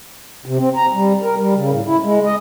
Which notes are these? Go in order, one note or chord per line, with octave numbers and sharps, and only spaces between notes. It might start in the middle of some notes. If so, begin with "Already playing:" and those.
C3
C4
A#5
G3
A#4
G3
C#3
A2
E4
G#3
D#5